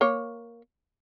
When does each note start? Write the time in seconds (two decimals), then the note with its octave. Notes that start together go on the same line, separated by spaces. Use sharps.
0.01 A#3 C#5